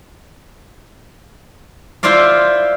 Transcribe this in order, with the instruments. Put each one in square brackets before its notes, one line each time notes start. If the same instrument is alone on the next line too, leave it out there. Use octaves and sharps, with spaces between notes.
[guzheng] E4 F4 C5 D5 F5